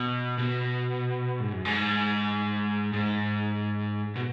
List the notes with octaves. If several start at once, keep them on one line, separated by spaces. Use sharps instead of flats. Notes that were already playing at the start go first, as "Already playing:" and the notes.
Already playing: B2
B2
G#2
F#2
G#2
G#2
B2